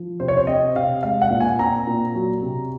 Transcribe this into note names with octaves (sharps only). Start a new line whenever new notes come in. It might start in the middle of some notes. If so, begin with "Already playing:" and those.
Already playing: F3
C3 C5
C#5
C5
C4 D#5
C3 F5
G#3 F5
F#5
A#2
G#5
C4 A#5
A#2
F#3
C3